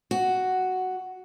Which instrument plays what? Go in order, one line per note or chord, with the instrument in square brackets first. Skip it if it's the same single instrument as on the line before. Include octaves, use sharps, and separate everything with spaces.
[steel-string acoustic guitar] F#4